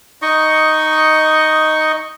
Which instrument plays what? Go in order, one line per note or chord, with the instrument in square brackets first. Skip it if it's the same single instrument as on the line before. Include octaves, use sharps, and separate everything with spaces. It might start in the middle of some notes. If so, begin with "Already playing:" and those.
[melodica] D#4 D#5 C#6